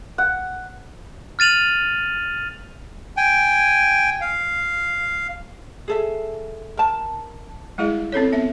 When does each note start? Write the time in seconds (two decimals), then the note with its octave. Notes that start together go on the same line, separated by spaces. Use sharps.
0.18 F#5
1.39 F6 A6 D#7 F7 F#7
3.17 G5 G#5
4.21 F5
5.88 G#4 A4 E5
6.77 A#4 A5
7.78 G3 G#3 E4 G#4 D#5
8.12 C4 C#4 A4 C#5
8.32 B3 E5